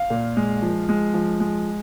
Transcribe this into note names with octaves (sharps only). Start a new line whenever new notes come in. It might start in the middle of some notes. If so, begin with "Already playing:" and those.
Already playing: F5
A#2
G#3
F3
G#3
F3
G#3